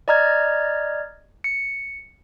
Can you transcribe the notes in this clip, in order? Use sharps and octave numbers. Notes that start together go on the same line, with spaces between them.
D5 D#5 A#5 F6 G#6
C#7